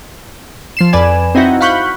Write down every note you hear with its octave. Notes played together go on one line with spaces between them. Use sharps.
F3 C7 E7
F2 B4 D5 G#5 E7
C4 D#4 E4 F#4
F5 F#5 B5 C#6 F#6 G6